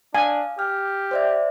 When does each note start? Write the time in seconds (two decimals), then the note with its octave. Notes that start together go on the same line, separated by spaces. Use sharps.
0.15 D4 F5 G#5
0.59 G4 F6
1.11 C5 D5 E5